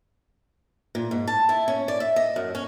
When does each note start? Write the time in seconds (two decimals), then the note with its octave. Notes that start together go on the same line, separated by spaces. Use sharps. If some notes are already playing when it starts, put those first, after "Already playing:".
0.95 A#2
1.11 G#2
1.27 A5
1.49 E4
1.68 C#4
1.88 D5
2.00 E5
2.16 D#5
2.36 F#2
2.55 C#4